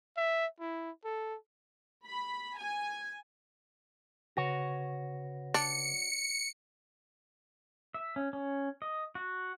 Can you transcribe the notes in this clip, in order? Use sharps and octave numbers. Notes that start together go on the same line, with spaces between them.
E5
E4
A4
B5
G#5
C#3 F#4 B4 C#5 A#6
D4 C#7
E5
C#4
C#4
D#5
F#4